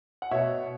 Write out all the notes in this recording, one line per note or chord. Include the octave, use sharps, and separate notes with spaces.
F#5
B2 C#5 E5